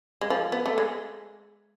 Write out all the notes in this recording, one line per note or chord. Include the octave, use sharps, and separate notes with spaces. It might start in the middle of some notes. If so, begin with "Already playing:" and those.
G#3
F3
B3
A3
G#3